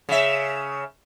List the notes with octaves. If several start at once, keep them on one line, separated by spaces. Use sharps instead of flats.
C#3 E5